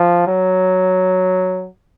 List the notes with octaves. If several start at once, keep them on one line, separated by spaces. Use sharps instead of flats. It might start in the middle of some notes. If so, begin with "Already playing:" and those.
Already playing: F3
F#3